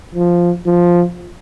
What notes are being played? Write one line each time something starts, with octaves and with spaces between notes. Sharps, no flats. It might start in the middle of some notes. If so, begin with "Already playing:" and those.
F3
F3